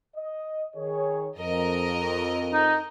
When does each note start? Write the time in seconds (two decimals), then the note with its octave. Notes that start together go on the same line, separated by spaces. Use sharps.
0.16 D#5
0.75 D#3 G#4 C#5
1.38 F2 A#4 D#5
2.53 D#4